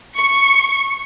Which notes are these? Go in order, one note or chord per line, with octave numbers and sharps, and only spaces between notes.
C#6